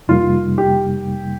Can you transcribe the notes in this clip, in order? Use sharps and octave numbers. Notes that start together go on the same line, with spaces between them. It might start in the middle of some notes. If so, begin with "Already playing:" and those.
F2 C3 G3 A#3 D#4 F4
G4